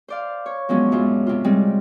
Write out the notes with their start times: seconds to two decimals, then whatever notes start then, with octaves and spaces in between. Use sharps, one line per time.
0.08 C5 D5 F5
0.46 C#5
0.69 F3 F#3 G#3 B3 C#4 D4
0.92 F#2 A2 G#3 F4
1.26 C3 F4
1.44 G3 G#3 C4